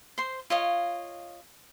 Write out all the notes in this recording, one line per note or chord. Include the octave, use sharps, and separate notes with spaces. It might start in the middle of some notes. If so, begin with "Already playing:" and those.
C5 C6
F4 C#5 D#5 F5